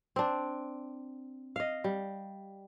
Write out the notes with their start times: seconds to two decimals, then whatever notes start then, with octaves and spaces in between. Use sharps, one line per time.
0.16 C4 D4
1.56 D#5 F5
1.84 G3